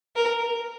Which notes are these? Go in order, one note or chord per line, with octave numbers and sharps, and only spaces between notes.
A#4